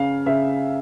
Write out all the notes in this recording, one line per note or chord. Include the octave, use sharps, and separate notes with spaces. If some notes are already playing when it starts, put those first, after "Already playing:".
Already playing: C#3 F5
C#3 E5